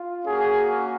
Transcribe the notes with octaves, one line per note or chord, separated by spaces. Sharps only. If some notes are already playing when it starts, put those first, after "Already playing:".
Already playing: F4
A#3 C#4 F#4 G#4